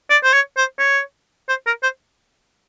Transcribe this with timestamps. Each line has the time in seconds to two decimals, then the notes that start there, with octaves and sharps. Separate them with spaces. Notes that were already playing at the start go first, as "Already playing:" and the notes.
0.10 D5
0.24 C5
0.33 C#5
0.57 C5
0.79 C#5
1.49 C5
1.67 A#4
1.83 C5